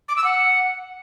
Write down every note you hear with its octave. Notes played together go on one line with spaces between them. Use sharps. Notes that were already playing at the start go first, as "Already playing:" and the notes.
D6
E6
F#5